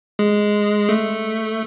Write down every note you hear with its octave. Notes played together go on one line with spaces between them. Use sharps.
G#3
A3